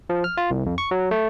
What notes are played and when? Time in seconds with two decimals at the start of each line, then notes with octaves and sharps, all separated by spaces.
0.10 F3
0.24 F6
0.37 F4
0.50 C2
0.66 F2
0.78 C#6
0.91 F#3
1.11 A3